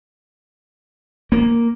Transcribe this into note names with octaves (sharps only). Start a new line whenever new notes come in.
A#3